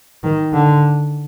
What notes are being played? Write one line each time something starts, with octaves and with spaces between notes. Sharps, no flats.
D#3
D3